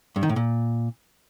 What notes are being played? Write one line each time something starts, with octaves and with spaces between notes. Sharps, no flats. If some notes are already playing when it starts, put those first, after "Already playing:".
G2
D#3
A2
A#2